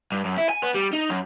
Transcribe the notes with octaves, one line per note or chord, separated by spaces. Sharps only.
G2
F#2
E4
G#5
B3
G3
D#4
F#2